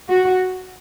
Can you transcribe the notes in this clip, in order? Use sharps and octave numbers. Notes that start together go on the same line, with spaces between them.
F#4